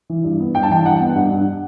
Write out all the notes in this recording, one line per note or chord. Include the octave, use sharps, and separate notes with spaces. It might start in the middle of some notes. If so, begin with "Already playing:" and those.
E3
G2
B3
G2 G5
A5
E3 G5
G2 F#5
B3
G2 F#5
G2